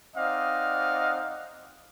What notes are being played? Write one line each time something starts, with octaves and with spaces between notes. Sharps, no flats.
C4 D#4 D5 D#5 F5 F#5